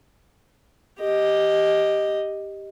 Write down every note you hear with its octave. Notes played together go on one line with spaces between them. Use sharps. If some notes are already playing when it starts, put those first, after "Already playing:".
G4 D#5